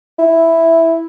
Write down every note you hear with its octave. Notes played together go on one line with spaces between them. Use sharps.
E4